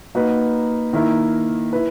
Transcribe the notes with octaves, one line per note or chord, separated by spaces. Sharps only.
A#3 D#4 F#4 B4
D#3 A#3 E4 A#4
E4 B4